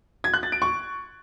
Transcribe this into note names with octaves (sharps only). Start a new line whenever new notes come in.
G#6
F#6
A6
D7
C#6